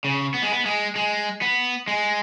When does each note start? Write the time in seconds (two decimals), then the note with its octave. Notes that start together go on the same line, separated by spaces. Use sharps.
0.04 C#3
0.34 B3
0.42 G#3
0.52 B3
0.65 G#3
0.96 G#3
1.42 B3
1.88 G#3